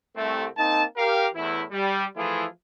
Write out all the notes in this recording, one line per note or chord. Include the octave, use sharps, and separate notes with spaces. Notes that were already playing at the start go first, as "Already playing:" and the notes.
C2 A3 C4
A#3 C4 D#4 A5
G4 A#4 F5
E2 A2 E3 E4
G3
E3 F3 A3 E4 F4 G#4